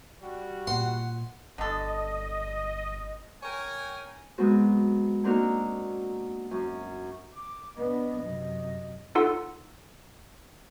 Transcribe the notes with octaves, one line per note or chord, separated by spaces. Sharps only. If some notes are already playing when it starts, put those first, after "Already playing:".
G3 F#4
A#2 F#5 C6
G1 D3 A4 D#5
A#4 C#5 G5 G#5
F#3 G#3 B3 C4 F#4
A#3 C4 D4 D#4 F#4 A#4
F#2
D6
B3 D4 D#5
F#2 C3
D#4 F4 A4 F#5 C6 E6